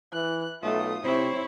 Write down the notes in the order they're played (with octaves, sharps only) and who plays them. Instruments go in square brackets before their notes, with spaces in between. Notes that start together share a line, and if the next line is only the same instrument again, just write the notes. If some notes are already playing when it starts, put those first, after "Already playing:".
[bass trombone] E3 [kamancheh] F#6
[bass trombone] B1 [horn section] A3 [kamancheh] F4 D#6
[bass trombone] C3 [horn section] C4 [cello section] E4 [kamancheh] C#5